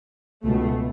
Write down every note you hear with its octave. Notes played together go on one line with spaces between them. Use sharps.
C#2 B2 A3